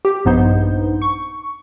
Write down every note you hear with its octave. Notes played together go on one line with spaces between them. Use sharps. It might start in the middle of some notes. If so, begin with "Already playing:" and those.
G4
A#1 G2 B3 D#4 C5 G6
C#6